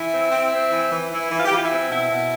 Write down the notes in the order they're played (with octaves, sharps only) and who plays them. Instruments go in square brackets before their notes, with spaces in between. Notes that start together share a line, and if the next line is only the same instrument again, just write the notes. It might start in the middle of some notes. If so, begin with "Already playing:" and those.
Already playing: [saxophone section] E3 E4
C4
C4
C4
E3
E3
E3 E4
E3
F4
G4
E3 F4
E4
C4
B2 E4
B2